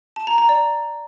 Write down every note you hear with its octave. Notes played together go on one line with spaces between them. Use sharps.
A5
A#5
A#5
D5